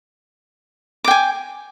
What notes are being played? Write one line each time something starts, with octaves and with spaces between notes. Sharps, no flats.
G5 G#5 D6